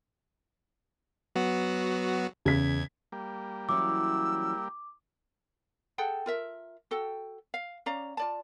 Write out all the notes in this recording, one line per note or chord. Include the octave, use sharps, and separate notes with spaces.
F#3 B3 F#4
E2 C#3 G#6 B6
G3 A#3 G4
E3 F#3 C#4 D6 E6
G#4 A4 F#5 G5
F4 A#4 E5
F#4 A4 G5
F5
C#4 D5 F5 A#5
F4 D5 A5